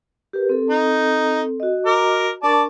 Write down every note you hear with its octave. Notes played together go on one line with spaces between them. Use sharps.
G4 A#4 B4
C4 A4
D#4
F#4 D#5
A#4 D6
D4 A#4 D5 A5 C#6